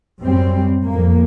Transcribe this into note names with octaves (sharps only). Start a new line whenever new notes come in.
F#2 G3 C4
F2 A#3